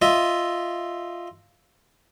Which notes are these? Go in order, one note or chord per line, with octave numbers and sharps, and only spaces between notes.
F4 D#5 E5